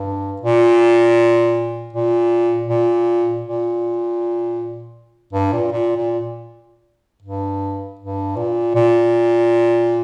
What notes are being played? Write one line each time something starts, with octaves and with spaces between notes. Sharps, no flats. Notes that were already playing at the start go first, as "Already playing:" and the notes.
Already playing: G2
A#2
A#2
A#2
A#2
G2
A#2
A#2
A#2
G2
G2
A#2
A#2